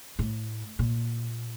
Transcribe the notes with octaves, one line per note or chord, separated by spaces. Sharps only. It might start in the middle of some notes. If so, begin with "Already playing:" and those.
A2
A#2